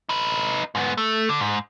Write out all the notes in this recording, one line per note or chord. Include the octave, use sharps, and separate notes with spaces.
D#4 B4
G#2 B3
A3
D3
G#2